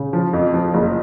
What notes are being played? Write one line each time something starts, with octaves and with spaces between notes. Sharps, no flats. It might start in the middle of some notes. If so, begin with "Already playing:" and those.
Already playing: C#3
F3
F2
F3
F#1